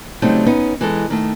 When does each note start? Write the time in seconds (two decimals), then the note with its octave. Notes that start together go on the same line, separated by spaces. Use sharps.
0.22 C#3 F#3 G3 A3 C4 D#4
0.46 B3 C#4 D#4
0.81 E3 G#3 A4
1.10 D#3 A3